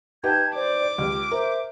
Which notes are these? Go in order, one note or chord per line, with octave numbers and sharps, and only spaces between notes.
D#4 G4 B4 A5 G6 G#6
C5 D5 D6
C#2 G4
A#4 C5 E5